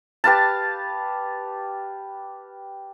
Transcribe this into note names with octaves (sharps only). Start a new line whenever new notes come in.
G4 B4 F5 A5